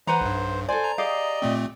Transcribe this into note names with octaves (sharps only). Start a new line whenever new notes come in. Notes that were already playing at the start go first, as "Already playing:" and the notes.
E3 B4 C5 F#5 A#5
B1 G2
A4 C5 D5 G#5
A#5
G4 G#4 D5 D#5 F5
A#2 A3 C4